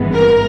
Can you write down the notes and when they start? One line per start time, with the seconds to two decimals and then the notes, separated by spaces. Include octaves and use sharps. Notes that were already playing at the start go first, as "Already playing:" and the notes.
Already playing: G#1 G2 E3 G#3 B3
0.13 A#4